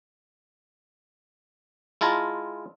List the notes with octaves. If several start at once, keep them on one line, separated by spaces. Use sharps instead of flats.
G#3 E4 F4 A5 A#5